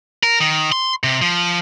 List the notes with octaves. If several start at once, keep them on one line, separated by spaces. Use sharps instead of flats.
A#4
D#3
C6
C3
F3